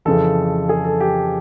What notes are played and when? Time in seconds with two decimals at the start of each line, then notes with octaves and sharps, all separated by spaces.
0.05 F2 C#3 E3 A4
0.69 G#4
0.84 A4
1.00 G4